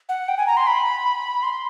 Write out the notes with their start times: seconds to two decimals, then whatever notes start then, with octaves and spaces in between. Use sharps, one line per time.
0.09 F#5
0.28 G5
0.37 G#5
0.47 A#5
0.57 C6
0.67 B5
1.43 C6